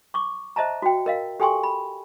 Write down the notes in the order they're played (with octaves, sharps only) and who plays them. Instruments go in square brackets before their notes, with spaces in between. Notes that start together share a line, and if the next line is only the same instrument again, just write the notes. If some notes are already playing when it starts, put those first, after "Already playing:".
[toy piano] C#6 D6
C5 D#5 E5 A5 A#5
F#4 G5
A#4 D#5 F5
G4 A4 G5 G#5 C6 C#6
B5